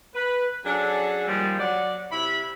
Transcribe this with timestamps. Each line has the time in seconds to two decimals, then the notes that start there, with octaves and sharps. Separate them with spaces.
0.15 B4
0.65 F#3 C#4 D4 G#4 A4
1.28 A#2 D#3 F3 G3 G#3
1.60 F#3 D5 F#5
2.12 C3 E4 B5